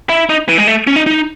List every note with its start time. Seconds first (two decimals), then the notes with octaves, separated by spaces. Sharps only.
0.09 E4
0.29 D#4
0.49 E3
0.58 G#3
0.67 A3
0.87 C#4
0.96 D#4
1.06 D#4